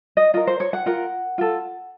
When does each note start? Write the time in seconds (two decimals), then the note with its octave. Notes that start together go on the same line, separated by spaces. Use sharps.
0.17 D#5
0.34 F4 A#4 D#5
0.47 C5
0.60 C#5
0.73 F#5
0.86 F4 A#4 F#5
1.38 F4 A4